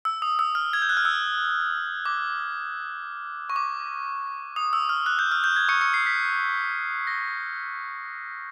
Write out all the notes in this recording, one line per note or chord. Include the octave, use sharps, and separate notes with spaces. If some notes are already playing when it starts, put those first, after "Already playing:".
E6
D#6
E6
F6
G#6
G6
F#6
F6
E6
D6
C#6
D6
D#6
E6
F6
F#6
G6
F6
G6
G#6
C#6 C#7
C#6 C#7
C7
B6
A#6